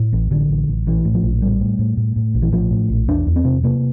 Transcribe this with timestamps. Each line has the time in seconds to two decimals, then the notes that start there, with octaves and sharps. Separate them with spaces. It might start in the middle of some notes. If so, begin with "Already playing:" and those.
Already playing: A2
0.13 A1
0.31 A1 D3
0.49 A1
0.68 A1
0.87 A#1 E3
1.05 A2
1.14 F3
1.23 A#1
1.41 A2 G3
1.60 A2
1.79 A2
1.97 A2
2.16 A2
2.34 A#1
2.42 E3
2.52 A2 F3
2.71 A2
2.90 A#1
3.08 E2 D4
3.27 E2
3.36 C4
3.45 C3
3.63 C3 A#3